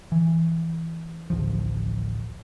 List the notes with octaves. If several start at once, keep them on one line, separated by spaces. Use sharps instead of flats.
E3
A1 D2 F3